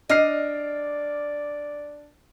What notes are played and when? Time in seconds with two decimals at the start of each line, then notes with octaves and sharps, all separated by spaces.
0.09 D4 D5 D#5 F6 C7